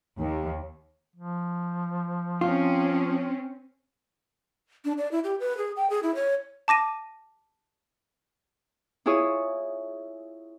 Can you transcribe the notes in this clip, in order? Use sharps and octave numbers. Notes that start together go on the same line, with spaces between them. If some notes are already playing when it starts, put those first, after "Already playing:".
D#2
F3
C4 C#4 F4
D4
D5
E4
G4
B4
G#4
G5
G#4
E4
C#5
A5 D6 A#6 D#7
E4 F4 G#4 C#5 D#6